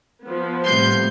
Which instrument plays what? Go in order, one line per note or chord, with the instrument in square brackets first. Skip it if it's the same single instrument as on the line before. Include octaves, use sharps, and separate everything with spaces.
[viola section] F3 B3
[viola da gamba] A2 C3 G3 [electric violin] C6 G6